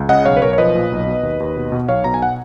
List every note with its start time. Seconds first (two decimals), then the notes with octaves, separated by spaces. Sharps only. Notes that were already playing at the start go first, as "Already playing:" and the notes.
Already playing: C#2
0.09 C#3 D#5 F#5
0.25 B1 C#5 F5
0.37 B4
0.42 B1 A#4 C#5
0.53 C#5
0.58 F3 B4 D#5
0.75 A#2
0.92 B1
1.07 B2
1.23 D#2
1.40 D#2
1.57 B2
1.72 B2
1.88 B1 C#5 F5
2.04 B2 A#5
2.14 G#5
2.22 F#5